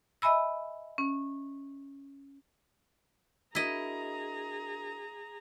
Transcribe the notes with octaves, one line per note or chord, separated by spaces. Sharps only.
D#5 E5 G#5 B5 E6
C#4
D4 E4 F#4 G#4 A#4 D#5 A#5